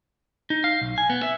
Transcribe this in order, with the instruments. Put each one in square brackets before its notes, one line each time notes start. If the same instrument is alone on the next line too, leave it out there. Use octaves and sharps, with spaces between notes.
[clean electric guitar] D#4
F5
B1
G#5
B3
E5